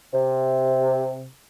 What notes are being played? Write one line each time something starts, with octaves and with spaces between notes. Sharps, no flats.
C3